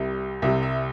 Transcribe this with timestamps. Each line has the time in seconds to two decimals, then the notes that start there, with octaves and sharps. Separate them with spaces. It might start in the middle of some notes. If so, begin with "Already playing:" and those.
Already playing: C2 C3 G3
0.42 C2 C3 G3 E5
0.63 E5